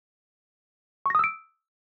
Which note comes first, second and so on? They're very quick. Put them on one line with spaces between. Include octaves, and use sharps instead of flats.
C#6 A#6 D#6 E6 D7